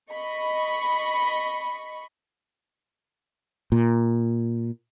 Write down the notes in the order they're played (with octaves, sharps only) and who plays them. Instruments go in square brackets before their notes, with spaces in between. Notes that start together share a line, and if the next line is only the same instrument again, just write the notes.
[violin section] D#5 B5 C#6
[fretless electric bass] A#2